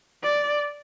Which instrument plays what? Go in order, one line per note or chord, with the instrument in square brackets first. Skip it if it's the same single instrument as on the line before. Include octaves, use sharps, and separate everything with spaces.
[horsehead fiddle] D5